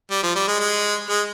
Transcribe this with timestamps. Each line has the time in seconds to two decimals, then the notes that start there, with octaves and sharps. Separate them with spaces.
0.11 G3
0.23 F3
0.36 G3
0.48 G#3
0.60 G#3
1.10 G#3